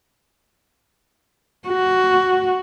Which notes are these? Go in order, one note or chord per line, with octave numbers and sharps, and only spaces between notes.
F#4